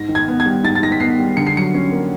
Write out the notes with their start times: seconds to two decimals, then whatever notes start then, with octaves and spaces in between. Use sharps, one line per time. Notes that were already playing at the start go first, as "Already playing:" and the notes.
Already playing: G#2 A#6
0.09 D#3
0.15 G#6
0.28 B3
0.40 G#6
0.46 G3
0.63 G#2 A6
0.75 A6
0.82 D#3 A#6
0.92 B6
1.00 B3 C7
1.19 G3
1.37 D3 C#7
1.47 C7
1.56 F#3 C#7
1.74 C#4
1.92 A#3